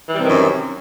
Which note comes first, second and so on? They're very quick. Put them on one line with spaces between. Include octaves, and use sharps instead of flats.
E3 G3 C3 D#3 F#2